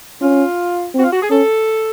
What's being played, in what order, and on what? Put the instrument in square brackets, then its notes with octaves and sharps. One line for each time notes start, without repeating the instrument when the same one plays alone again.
[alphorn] C#4 [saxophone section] F4
[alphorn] C4 [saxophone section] F#4
[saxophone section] F4
F#4
G#4
[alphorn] C#4 [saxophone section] A4